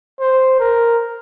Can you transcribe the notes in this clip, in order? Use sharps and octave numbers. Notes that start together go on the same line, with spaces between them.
C5
A#4